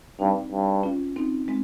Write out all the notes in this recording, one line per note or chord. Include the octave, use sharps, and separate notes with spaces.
G2 C4 D#4
G2
C#4 F4
C4 D#4
G#3 C4